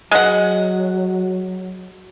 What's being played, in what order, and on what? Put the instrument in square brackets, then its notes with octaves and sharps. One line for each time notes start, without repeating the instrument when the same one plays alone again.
[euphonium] F#3 [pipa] G#3 F#5